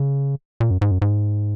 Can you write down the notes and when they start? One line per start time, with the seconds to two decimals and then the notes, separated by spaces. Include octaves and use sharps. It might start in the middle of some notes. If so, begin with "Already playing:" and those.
Already playing: C#3
0.60 A#2
0.70 F#2
0.81 G#2
0.91 F#2
1.02 G#2